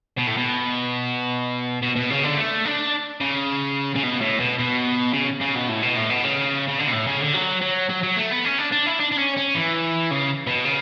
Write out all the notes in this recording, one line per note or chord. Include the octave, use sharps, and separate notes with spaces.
B2
A2
B2
B2
B2
C#3
D3
A3
D4
C#3
C#3
B2
A2
B2
B2
C#3
C#3
B2
A2
B2
A2
B2
C#3
C#3
D3
B2
A2
C#3
D3
F#3
F#3
F#3
F#3
A3
B3
C#4
D4
D4
E4
D4
D4
C#4
C#4
E3
C#3
B2
C#3